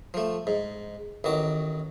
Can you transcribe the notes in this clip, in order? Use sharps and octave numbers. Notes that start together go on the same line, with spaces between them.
F3 A3
G#2
A1 D#3 F#4 D6